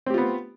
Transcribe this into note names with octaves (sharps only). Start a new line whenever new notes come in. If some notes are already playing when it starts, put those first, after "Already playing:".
B3 C4 F4 G4